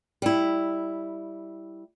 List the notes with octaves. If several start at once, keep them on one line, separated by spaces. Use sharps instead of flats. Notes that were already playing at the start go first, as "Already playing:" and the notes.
G3 E4